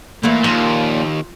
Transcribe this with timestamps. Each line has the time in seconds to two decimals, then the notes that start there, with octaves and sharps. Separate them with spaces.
0.23 A#2 E3 A3 A#3
0.44 D#2 F3